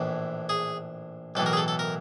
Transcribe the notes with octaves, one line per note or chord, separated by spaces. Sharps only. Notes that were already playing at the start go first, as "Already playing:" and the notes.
Already playing: A#1 A2 E3
G#4
B1 A2 E3 A4
A#4
G#4
A4
A4
A#4